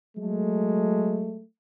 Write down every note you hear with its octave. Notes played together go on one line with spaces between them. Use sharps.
F#3 G#3 A3